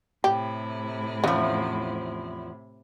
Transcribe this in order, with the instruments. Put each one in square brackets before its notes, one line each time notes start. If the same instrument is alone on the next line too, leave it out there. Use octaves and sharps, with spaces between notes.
[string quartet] A2 C3 E4 [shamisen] G4
[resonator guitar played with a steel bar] E2 F3 [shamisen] C#3